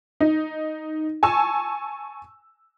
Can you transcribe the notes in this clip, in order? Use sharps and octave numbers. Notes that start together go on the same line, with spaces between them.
D#4
G#5 A5 C#6 E6